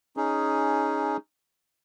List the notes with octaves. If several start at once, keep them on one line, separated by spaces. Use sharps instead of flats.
C#4 D#4 G#4